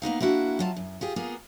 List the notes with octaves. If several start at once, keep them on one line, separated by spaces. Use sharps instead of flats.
A#3 B3 D#4 F5
A#3 D4 E4 F#4
F#3 F4 A5
F#2
F4 G4 G#4
A#3 B3 F4 G#4